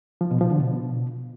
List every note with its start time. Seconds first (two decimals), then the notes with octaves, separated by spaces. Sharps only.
0.21 F3
0.31 B2
0.41 F3
0.51 D3
0.60 B2